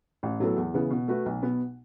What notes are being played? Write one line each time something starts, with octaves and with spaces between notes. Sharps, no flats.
A1
A2 F#3 B3 A4
E2
C#3 E3 B3
B2
A3 F#4 B4
B1
B2 B3